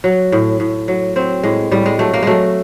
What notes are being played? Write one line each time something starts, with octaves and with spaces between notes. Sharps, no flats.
F#3
A2
A2
F#3
F#3 C4
A2 G#3
A2 G3
G#3
F#3 A3
A#3
F#3 G#3 A3